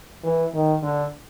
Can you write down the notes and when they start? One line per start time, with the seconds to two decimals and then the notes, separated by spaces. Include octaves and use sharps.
0.24 E3
0.54 D#3
0.83 D3